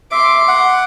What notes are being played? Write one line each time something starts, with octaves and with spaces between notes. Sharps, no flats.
E5 C6 D6
F#5